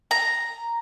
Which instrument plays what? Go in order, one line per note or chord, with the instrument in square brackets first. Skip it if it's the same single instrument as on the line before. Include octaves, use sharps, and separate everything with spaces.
[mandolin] A#5